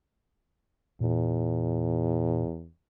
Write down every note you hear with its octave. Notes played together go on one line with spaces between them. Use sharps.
E2 A#2